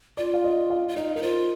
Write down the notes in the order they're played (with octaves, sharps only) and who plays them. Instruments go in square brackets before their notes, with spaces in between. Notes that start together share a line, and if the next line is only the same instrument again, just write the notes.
[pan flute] F4 [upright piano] D5
[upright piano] F5
D#5
F5
[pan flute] F4
[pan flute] D#4 [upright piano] D#5
[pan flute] D#4 [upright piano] A#4
[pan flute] F4 [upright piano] C5